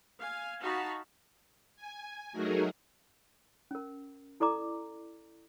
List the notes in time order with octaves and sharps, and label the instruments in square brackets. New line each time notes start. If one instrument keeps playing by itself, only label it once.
[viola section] F5 G#5
D#4 F#4 F5 A5 B5
[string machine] G#5
F#3 A3 D#4 F#4 G#4 A#4
[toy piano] C#4 A#4
E4 A4 D5 A#5 D6